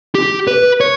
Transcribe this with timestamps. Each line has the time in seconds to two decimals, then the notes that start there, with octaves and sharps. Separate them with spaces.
0.15 G4
0.47 B4
0.81 C#5